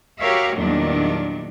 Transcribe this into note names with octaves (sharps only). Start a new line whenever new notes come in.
F#4 G4 A#4 C#5 E5 F5
E2 A#2 D#3 F#3 G3 D4